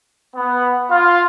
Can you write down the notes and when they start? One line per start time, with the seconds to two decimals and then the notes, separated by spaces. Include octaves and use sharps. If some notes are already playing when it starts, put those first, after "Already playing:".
0.36 B3
0.91 F4